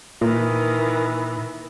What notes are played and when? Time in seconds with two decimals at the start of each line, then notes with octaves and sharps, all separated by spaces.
0.21 A#2 D#3 E3